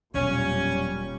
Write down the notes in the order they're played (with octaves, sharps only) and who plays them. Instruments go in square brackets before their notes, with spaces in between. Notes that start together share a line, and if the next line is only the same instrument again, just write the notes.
[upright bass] E1 F#3 [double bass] A#2 G3 [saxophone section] C#4